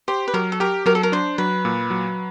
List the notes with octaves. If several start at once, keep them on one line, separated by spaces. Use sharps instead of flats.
G4 C5
B4
F#3 A#4
A4
G4 A#4
F#3 A#4
A4
A#4
D4 C5
F#3 B4
A#2
F#3